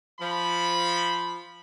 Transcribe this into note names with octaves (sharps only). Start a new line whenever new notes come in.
F3 B5